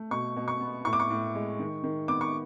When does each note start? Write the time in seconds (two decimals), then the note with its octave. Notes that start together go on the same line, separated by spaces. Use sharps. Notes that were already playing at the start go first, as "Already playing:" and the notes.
Already playing: A3
0.11 B2 C#6
0.36 B2
0.48 C#6
0.60 B3
0.85 A2 C#6
0.93 D6
1.00 C#6
1.10 A2
1.35 G#3
1.59 D#3
1.84 D#3
2.08 B3 D6
2.21 C#6